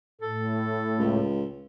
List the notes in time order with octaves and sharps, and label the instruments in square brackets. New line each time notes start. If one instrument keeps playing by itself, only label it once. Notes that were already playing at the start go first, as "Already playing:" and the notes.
[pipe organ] A2 [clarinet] A4
[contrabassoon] C#2